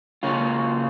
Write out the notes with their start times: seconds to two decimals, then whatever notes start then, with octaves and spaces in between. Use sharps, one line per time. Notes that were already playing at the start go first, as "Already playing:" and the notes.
0.23 C#3 A#3 C#4 F4